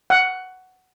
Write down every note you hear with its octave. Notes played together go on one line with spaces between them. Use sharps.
F#5